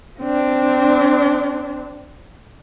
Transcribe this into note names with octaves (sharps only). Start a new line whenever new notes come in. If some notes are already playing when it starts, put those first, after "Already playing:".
C4 D4